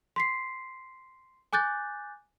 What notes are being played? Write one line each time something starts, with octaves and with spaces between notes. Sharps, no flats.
C6 B6 C7
G#5 D6 F#6 G6 A6